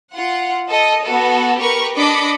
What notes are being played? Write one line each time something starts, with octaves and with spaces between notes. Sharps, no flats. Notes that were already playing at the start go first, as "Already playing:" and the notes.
F4 F#5
A4 D#5
B3 F#4 A4
G4 A#4 B4 C#6
D4 D#5 B5 D6 C#7